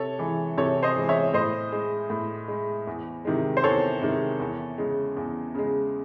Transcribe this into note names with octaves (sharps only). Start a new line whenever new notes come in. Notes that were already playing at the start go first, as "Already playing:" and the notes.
Already playing: C3 A4 C#5
E3 G#3
C3 A4 C#5
C5 D#5
E3 G#3
C#5 E5
A2 C5 D#5
G#3
A2
G#3
E2
C3 D#3 G#3
C5
E2 A4 C#5
C3 D#3 G#3
E2
C#3 G#3
E2
C#3 G#3